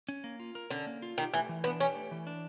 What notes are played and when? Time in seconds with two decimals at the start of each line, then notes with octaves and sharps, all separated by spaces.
0.09 C#4
0.24 A#3
0.40 F4
0.55 A#4
0.70 D3 C#4
0.87 A#3
1.02 F4
1.18 D#3 G4
1.34 E3 A3
1.49 E3
1.64 B3 D4
1.80 C#4 G4
1.95 A3
2.11 E3
2.27 D4